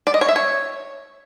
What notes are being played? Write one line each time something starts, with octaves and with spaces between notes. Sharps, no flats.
D5
D#5
C#5
E5
C#5